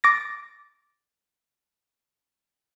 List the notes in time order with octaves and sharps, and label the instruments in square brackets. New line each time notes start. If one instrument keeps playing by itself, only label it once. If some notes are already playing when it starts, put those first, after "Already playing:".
[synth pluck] D6 A6 A#6